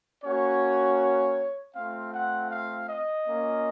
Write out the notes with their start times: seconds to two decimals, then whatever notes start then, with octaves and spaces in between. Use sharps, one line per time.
0.24 A#3 C#4 F#4 C#5
1.75 A3 C4 F4 F5
2.13 F#5
2.51 F5
2.89 D#5
3.26 A#3 C#4 F4